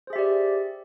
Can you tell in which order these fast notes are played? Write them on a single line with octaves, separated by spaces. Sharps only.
C5 G#4 E5 G4 D5